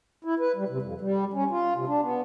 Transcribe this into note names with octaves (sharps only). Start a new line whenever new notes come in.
E4
B4
G3
C3
F2
G3
C#4
F4
C3
D4
B3